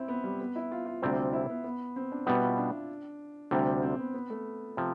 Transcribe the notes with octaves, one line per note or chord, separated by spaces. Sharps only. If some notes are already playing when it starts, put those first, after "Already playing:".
Already playing: C4 E4
B3
G3
B3
E4
F4
F4
D2 C3 G3 C4
E4
B3
B3
C4
D4
B2 G3 B3 E4
F4
D4
D2 C3 G3
C4
B3
B3
A3
C3 F3